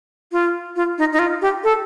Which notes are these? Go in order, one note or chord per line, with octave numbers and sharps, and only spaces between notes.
F4
F4
D#4
D#4
F4
G4
A4